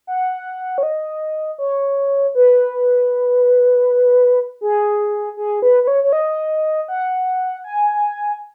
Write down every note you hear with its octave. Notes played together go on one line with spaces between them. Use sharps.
F#5
C#5
D#5
C#5
B4
G#4
G#4
B4
B4
C#5
C#5
D#5
F#5
G#5